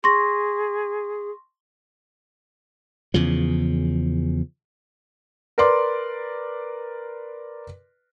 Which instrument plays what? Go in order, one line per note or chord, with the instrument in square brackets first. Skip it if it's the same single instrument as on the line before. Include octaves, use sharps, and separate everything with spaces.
[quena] G#4 [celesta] C6 C#6 A#6
[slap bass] E2 C#3 F3
[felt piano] A#4 B4 D5 C6 D6